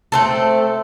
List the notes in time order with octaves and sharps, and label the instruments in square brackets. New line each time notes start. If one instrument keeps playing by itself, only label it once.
[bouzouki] A3 C4 A4